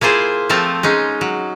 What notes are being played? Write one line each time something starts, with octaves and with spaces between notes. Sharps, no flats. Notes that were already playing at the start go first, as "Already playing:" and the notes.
A#3 E4 F4 G#4 C5
F3 A3 C4 F4
G#3 C#4 D#4
F#3